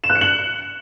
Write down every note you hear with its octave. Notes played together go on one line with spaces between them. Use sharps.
E7
F#6
C#7
F#7